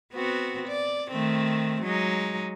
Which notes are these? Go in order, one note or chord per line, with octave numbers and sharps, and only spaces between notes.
B3 C4 F#4
D5
D#3 A3 C4
F#3 G#3 D#4